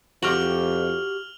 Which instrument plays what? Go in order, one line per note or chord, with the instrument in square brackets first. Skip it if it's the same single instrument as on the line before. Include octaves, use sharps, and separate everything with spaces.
[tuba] F2 [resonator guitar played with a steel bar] F#4 G4 [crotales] F6 F7 F#7